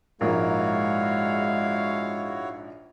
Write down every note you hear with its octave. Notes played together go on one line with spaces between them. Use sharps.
A#1 G#2 G#3 A#3 E4 F#4 C#5 F5